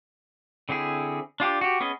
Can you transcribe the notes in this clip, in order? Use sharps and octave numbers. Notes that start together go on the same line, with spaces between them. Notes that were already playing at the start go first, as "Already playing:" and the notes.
D3 C4 E4 G#4
D4 F4 G4
F#4 G4
B3 C#4 G#4 D#5